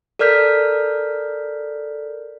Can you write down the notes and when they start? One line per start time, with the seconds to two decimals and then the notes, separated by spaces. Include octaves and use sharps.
0.19 A4 A#4 D5 F6 G6 B6